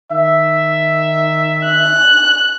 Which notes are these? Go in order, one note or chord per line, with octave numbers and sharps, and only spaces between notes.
D#3 E5
F#6